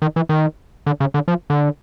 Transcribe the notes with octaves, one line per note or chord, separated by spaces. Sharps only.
D#3
E3
D#3
D3
C#3
D3
F3
D3